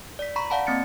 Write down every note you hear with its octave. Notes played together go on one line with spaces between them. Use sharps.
D5 B6
A#5 B5 C#6 B6
D5 F5 F#5 A5 B5
A#3 C4 A6 C#7